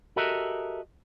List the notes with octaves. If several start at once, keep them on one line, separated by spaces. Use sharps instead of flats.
F#4 G4 A4 A#4 D#5 E5